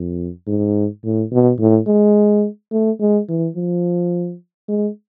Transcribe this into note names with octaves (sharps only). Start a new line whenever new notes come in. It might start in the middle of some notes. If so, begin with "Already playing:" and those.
Already playing: F2
G#2
A2
B2
A2
G#3
A3
G#3
E3
F3
G#3